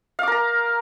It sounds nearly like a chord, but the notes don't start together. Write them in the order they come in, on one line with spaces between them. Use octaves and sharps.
F5 D6 A#4 A#5